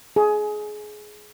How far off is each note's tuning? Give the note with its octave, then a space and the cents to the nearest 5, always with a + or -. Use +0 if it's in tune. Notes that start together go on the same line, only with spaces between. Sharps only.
G#4 +20